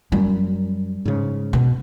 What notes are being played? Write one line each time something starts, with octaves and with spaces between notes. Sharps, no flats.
F#2 G3
G#2 C#3
B2